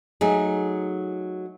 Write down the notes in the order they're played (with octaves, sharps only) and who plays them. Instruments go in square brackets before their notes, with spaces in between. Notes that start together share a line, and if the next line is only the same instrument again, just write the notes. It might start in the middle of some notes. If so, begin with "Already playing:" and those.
[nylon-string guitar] F#3 A3 D#4 G#4